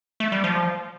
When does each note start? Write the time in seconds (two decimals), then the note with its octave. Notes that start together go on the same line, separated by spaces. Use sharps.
0.20 A3
0.32 G3
0.44 F3